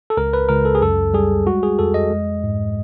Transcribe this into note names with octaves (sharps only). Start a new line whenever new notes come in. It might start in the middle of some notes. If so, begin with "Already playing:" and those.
A4
C#2 A#4
B4
C#2 A#4
A4
G#4
F#2 A4
G3 G#4
G#3 F#4
G#4
F2 A4
D#5
G#3
G#2